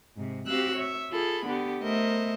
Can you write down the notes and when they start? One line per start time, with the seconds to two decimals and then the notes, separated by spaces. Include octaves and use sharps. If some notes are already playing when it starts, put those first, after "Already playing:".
0.16 G#2 C3
0.46 C4 F#4 G4 F5 E6 F#6
0.76 C#5 E5
1.11 F4 G#4 A4 B5
1.45 D3 B3 G4
1.81 A3 B3 A#4 C5 D#5 E5